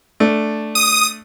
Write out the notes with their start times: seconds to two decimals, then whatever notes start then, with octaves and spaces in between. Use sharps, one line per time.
0.20 A3 D4
0.75 D#6